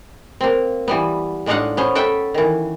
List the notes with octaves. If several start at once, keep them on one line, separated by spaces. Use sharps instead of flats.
A#3 C4
E3 G3 B3
A2 G#3 D4 D#4 F5 F#5
B3 C#4 C5
A4 B4 E5 G5
D#3 E3